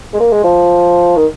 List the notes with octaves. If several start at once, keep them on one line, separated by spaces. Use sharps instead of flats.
G#3
A#3
G#3
F3
D#3